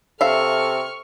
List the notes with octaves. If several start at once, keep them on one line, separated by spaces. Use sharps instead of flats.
C3 A4 E5 F5 C#6 F6